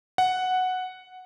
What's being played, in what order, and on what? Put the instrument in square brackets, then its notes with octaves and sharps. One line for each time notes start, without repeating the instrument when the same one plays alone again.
[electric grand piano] F#5